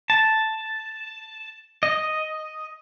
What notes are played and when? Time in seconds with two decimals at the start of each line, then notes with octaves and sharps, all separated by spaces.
0.10 A5
1.83 D#5